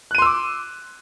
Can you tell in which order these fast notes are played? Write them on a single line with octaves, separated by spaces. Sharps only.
F#6 D#7 C6 E6 D6